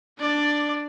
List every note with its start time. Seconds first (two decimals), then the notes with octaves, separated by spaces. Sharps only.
0.18 D4 D5